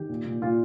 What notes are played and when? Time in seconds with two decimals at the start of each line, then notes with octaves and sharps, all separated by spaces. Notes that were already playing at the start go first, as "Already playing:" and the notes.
Already playing: D#3 G4
0.09 A#2
0.26 A#2
0.42 A#2 F4